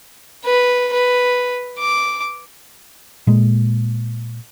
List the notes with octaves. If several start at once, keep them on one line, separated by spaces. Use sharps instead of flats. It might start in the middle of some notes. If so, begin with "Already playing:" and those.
B4
B4
D6
A#2 G#3